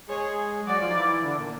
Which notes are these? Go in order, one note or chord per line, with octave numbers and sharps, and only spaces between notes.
G#3 G#4 C#5
F#3 F#4 D5
F3 F4
D#4
E3 E4
D3 D4
A#2 A#3